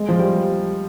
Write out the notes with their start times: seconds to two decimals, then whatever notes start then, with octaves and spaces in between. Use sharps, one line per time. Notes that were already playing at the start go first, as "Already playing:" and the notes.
Already playing: G#3
0.09 F3
0.19 G3